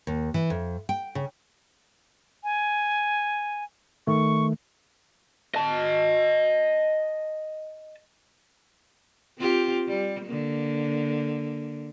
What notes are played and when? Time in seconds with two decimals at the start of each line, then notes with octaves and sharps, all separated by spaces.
0.07 D#2
0.34 E3
0.50 F2
0.89 G5
1.15 C#3
2.43 G#5
4.07 D#3 A3 C#6
5.55 D#5 A5
9.38 C4 F4 G4
9.88 G3
10.25 D3 A#3